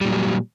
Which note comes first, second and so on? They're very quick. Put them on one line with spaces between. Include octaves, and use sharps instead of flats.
G3 A#2 F#3